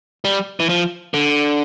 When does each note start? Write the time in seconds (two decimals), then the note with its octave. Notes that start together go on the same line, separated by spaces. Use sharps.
0.25 G3
0.60 E3
0.69 F3
1.14 D3